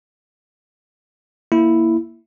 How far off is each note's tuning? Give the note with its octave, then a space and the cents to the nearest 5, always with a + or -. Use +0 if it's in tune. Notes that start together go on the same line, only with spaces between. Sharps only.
A#3 +0 E4 +0